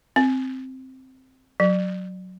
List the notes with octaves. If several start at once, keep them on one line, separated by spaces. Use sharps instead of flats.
C4
F#3